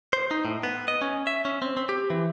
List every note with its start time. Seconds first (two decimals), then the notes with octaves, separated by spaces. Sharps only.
0.13 C5
0.31 D#4
0.45 A2
0.63 B3
0.88 D#5
1.01 C#4
1.27 E5
1.45 C#4
1.62 C4
1.77 C4
1.89 G4
2.10 E3